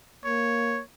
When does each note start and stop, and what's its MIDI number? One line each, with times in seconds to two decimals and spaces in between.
0.25 0.81 58
0.25 0.81 73